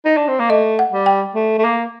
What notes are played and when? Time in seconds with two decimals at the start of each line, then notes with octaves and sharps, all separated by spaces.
0.05 D#4
0.17 D4
0.28 C4
0.40 A#3
0.50 A3 D#5
0.79 F#5
0.92 G3
1.06 G5
1.35 A3
1.58 A3
1.64 A#3